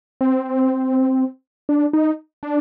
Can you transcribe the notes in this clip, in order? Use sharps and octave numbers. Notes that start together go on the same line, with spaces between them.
C4
D4
D#4
D4